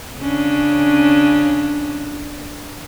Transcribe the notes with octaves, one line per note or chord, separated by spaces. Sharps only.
C#3 C#4 D4